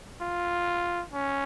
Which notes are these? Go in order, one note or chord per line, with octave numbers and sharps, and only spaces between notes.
F4
C#4